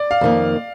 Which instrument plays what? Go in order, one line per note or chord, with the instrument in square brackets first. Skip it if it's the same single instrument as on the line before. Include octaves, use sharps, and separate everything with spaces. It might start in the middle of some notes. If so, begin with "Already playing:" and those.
Already playing: [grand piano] D5
F5
[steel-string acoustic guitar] F2 D#3 A#3